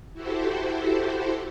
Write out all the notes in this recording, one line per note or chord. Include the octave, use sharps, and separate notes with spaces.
E4 F#4 G4 A4 C5